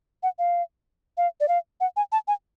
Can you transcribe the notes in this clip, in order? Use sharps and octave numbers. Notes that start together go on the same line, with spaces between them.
F#5
F5
F5
D5
F5
F#5
G#5
A5
G#5